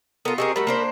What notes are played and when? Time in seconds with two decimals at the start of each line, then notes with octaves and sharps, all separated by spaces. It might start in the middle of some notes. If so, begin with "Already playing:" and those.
0.25 B3 F4 A4 A#4 D#6
0.38 C4 G4 G#4 A#4 D#5 C#6
0.56 G3 A3 F#4 A#4 B5
0.67 A#3 D4 C5